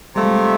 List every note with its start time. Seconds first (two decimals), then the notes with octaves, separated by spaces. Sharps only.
0.16 C3 F3 G3 A3
0.24 G#3
0.31 G3